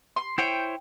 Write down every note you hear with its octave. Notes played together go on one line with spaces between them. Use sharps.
C6
E4 C5 C#5 G5